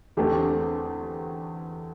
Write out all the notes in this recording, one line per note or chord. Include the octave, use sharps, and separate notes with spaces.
E2 D3 A3 C4 G4